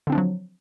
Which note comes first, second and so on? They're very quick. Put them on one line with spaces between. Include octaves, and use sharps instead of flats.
D3 C4 D4 F3 F#3